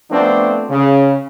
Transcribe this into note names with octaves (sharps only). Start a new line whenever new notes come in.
F3 A3 B3 C4 D4
C#3